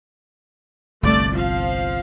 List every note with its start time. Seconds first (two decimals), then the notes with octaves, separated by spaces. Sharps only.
1.03 G1 C2 A3 D5
1.33 F3 F5